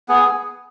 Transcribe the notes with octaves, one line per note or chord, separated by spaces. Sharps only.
B3 G#4